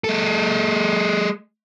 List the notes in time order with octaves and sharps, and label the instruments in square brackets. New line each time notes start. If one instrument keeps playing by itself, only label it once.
[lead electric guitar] G#3 A4